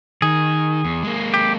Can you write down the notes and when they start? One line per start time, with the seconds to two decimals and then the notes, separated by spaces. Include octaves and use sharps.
0.22 D#3 G#4
0.85 E2
1.03 G#3 A#3
1.34 G4